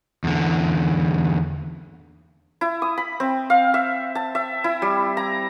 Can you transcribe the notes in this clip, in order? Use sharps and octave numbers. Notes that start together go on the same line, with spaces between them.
E2 D3
E4
D#6
B5
C4
F5
E5
A5
E5
E4
G3
A#5